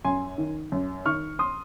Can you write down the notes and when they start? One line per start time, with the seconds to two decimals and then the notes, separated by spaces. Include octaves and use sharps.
0.05 F#2 G#5 C6
0.38 D#3
0.72 F#2
1.06 D#3 C#6 F6
1.39 C6 D#6